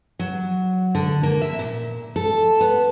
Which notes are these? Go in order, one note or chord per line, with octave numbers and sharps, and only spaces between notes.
F#3
D3
A#3
E5
A#2
A4
B3